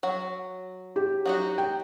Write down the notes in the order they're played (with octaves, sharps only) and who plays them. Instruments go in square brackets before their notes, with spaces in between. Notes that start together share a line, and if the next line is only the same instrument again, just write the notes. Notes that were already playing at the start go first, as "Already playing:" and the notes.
[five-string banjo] F#3
[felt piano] G4
[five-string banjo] F#3 D#4 F#4
[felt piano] G5